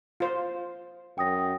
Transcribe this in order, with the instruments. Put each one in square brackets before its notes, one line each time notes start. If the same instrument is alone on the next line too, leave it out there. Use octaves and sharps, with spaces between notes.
[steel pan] F4 C5
[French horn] F#2 [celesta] G5 D#6 A#6